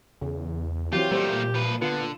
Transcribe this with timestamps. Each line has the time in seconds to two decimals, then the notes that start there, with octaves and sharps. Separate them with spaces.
0.22 E2 C#3
0.93 E3 F#3 C4 F4 G4
1.11 A#2 G3 A3 A#3 C5
1.54 F3 B4
1.82 D3 B3 F4